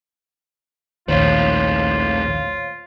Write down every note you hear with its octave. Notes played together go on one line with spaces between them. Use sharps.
A#1 D#2 A2 D#3 F4 C5 C#5 F5